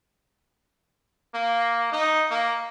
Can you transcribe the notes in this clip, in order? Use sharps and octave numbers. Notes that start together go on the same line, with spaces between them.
A#3
D#4
A#3